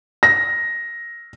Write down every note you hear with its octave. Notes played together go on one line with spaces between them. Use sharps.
A#6